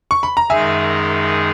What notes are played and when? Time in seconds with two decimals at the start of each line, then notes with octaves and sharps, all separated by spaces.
0.11 C#6
0.23 B5
0.37 A#5
0.49 F#2 D#3 G#3 D#4 G#4 E5 G#5